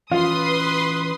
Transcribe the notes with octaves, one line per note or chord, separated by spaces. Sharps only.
E3 C#4 F4 B4 C6 D#6